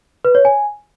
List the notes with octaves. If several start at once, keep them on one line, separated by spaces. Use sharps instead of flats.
B4
C#5
G#5